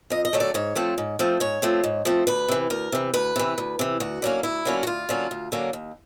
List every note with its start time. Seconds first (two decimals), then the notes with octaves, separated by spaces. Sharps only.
0.10 F2 D#5
0.25 D#5
0.33 D3 F#3 A3 C#4
0.40 D5
0.54 G#2 C#5
0.75 F3 A3 C4
0.98 G#2
1.19 F3 A3 C4
1.40 G#2 C#5
1.62 F3 A3 C4
1.84 G#2
2.05 F3 A3 C4
2.27 D2 B4
2.48 C3 E3
2.70 D2 A#4
2.92 C3 E3
3.14 D2 B4
3.36 C3 E3
3.58 D2
3.79 C3 E3
4.00 D2 F#4
4.22 D3 F#3 A#3 C#4
4.43 D2 E4
4.65 D3 F#3 A#3 C#4
4.83 F#4
4.87 D2 F4
5.09 D3 F#3 A#3 C#4
5.31 D2
5.52 D3 F#3 A#3 C#4
5.73 D#2